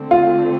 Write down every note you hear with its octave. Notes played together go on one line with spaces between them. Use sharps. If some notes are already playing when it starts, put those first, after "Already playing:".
Already playing: D3 A3 C4
F4